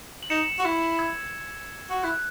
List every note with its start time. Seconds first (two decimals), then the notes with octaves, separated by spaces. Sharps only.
0.23 F#7
0.30 D#4 C#7 E7
0.59 F#4
0.65 E4
0.99 E6 G#6
1.90 F#4
2.03 E4 F#6